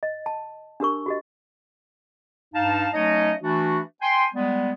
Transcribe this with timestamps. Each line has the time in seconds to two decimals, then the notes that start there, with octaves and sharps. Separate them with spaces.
0.03 D#5
0.26 A5
0.80 D4 G4 A#4 C#6
1.06 F#4 G4 D#5
2.54 G2 D#4 F5 A5
2.93 F#3 A3 C#4 D#4 C#5 D#5
3.42 E3 A3 D4 F#4
4.01 G5 G#5 C6
4.34 G3 G#3 B3